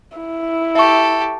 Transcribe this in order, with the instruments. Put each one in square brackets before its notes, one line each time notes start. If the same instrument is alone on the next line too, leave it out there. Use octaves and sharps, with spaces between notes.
[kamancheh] E4
[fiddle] G4 A4 [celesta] E5 C#6